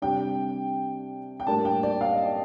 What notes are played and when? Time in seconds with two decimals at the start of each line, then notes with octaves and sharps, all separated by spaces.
0.02 C3 G3 D4 G5
1.40 G5
1.47 A2 G3 A#3 D4 A5
1.65 G5
1.83 D5
2.01 F5
2.13 D#5
2.26 D5